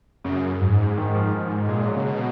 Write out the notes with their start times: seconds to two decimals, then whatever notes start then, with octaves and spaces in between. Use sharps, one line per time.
0.25 F#2 C#3
0.61 G#2
0.98 D#3
1.15 F3
1.33 F3
1.69 A#2 G#3
1.88 F#3
1.96 C#3
2.05 B2